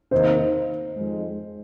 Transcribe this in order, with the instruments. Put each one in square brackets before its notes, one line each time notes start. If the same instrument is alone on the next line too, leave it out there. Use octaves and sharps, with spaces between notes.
[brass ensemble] C3 D#3 A#3 D#4 [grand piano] C5
[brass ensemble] F2 D#3 G#3